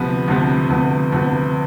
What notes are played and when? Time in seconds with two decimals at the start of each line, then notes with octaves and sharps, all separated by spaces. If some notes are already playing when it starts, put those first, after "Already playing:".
Already playing: D2 C3 F3 B3
0.28 D2 C3 F3 B3
0.70 D2 C3 F3 B3
1.12 D2 C3 F3 B3